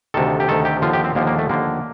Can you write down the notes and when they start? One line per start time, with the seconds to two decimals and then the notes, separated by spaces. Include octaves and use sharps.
0.14 D2 C3 D#3 A4
0.40 G4
0.48 D2 C3 D#3 A4
0.65 G4
0.82 D#2 D3 F3 F4
0.93 G4
1.04 C4
1.15 D#2 D3 F3 A#3
1.27 A#3
1.38 A3
1.49 D#2 D3 F3 A#3